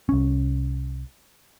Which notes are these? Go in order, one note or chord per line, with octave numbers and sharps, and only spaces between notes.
C2 C#4